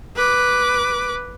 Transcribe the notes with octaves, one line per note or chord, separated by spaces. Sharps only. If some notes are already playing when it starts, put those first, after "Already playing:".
B4 D6